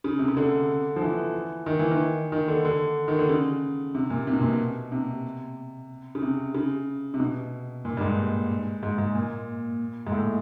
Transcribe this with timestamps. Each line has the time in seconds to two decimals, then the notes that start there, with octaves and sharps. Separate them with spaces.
0.04 C#3
0.19 C3
0.28 C#3
0.37 D3
0.96 F3
1.01 E3
1.66 D#3
1.79 E3
1.91 D#3
2.32 D#3
2.48 D3
2.65 D3
3.08 D#3
3.19 D3
3.29 C#3
3.95 C3
4.10 A#2
4.27 C3
4.34 B2
4.41 A#2
4.49 B2
4.92 C3
6.15 C#3
6.22 C3
6.54 C#3
7.14 C3
7.20 B2
7.85 A#2
7.97 G2
8.01 G#2
8.83 G#2
8.98 G#2
9.15 A#2
10.07 G#2
10.12 A2